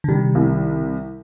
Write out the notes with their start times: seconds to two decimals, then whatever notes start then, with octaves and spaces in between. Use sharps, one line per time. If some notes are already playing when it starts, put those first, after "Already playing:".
0.04 D3
0.08 C3 D#3 G3
0.35 C2